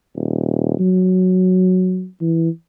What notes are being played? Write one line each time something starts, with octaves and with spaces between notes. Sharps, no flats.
D#1
F#3
E3